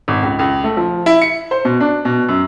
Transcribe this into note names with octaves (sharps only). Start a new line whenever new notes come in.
G#1
C#2
C#2
A3
F3
E4
C#7
C5
B2
D4
B2
F#2